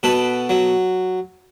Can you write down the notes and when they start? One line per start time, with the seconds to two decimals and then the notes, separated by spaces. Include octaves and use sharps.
0.03 B2 A4 B4
0.49 F#3